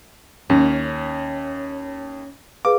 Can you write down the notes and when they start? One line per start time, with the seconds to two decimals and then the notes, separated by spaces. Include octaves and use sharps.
0.50 D#2 C#4
2.65 G#4 B4 F5 D6